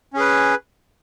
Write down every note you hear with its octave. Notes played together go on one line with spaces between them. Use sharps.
C#4 G#4 B4